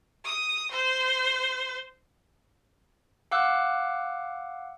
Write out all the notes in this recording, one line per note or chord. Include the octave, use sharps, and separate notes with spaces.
D#6
C5
F5 F#5 D6 E6 F#6